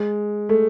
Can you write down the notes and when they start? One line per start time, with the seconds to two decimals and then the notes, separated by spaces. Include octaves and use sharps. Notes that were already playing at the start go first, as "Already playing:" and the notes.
Already playing: G#3
0.49 A3